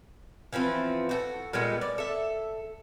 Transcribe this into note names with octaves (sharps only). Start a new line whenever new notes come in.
E3 F3 B3 C4
F#4 G4 A4
A#2 G3 G#3 B3
D5
A4 E5